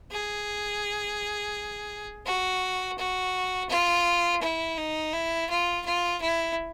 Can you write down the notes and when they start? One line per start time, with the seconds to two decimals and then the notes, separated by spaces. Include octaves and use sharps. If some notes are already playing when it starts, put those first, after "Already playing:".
0.11 G#4
2.26 F#4
2.98 F#4
3.70 F4
4.42 E4
4.78 D#4
5.13 E4
5.50 F4
5.85 F4
6.21 E4